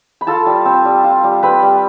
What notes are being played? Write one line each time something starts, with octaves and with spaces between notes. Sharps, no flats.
B5
F4 A4 A5
G3
C4
G3
F4
G3
C4 B4 B5
G3